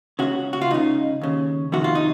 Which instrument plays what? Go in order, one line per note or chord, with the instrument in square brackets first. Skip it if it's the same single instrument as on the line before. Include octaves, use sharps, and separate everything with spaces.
[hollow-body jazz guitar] C#2 C#3 F#4
F#4
F4
C#2 C#3 D#4
D#2 C#3
F2 C3 D#3 F#4
F4
D#4